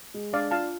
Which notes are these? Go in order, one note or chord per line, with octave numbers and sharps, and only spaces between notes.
G#3
D4 D5 F5
F4 F5 A5